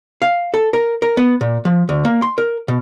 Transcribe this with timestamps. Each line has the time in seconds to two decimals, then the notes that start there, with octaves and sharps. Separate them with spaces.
0.22 F5
0.54 A4
0.73 A#4
1.02 A#4
1.17 B3
1.41 A#2
1.65 F3
1.89 D2
2.05 A#3
2.22 C6
2.38 A#4
2.68 B2